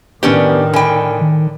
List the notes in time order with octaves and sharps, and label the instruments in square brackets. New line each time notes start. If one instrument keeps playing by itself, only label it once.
[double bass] A2 D#3 [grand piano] B3 [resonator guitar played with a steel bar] C#4 D4 G4
[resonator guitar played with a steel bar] D3 G5 [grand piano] G#5 B5
[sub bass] D#3